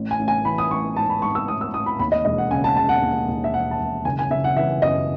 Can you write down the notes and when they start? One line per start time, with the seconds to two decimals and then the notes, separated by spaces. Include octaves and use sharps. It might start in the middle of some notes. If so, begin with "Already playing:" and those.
Already playing: A1
0.11 G#5
0.19 A1
0.28 G#5
0.45 E3 B5
0.58 D#6
0.70 A1 C#6
0.96 G#2 A5
1.10 B5
1.22 G#2 C#6
1.35 E6
1.48 A1 D#6
1.61 E6
1.74 A1 D#6
1.86 B5
1.99 D#2 B5
2.12 D#5
2.25 E1 D#5
2.38 F#5
2.51 C#3 G#5
2.64 A5
2.77 C#3 A5
2.89 F#5
3.02 D#2
3.28 D#2
3.44 E5
3.54 E1 F#5
3.71 A5
3.79 E1
4.05 F#1 G#5
4.19 G#5
4.31 F#1 E5
4.44 F#5
4.56 E3 E5
4.82 F#2 D#5